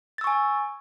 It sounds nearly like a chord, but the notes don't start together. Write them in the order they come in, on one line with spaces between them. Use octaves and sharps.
A6 E6 C#6 G#5